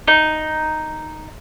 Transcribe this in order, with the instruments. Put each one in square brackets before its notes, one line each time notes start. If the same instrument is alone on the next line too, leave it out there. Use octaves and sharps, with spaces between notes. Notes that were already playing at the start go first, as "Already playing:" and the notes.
[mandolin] D#4